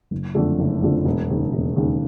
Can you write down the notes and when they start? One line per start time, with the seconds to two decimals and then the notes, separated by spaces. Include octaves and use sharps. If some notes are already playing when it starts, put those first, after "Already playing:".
0.11 F#1
0.35 F2 D3 F3 A3
0.59 F#1
0.82 F2 D3 F3 A3
1.05 E1
1.30 D#2 C#3
1.53 E1
1.76 D#2 C#3